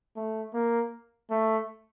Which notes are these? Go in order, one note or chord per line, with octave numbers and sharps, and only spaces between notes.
A3
A#3
A3